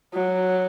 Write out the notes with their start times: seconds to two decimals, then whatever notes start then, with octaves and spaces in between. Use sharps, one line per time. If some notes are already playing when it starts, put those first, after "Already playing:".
0.15 F#3